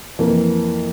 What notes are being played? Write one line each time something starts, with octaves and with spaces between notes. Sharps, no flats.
F2 E3 A#3